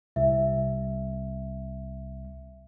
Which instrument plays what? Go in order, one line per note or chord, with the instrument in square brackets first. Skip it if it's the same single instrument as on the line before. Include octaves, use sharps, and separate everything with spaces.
[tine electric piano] C2 [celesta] E5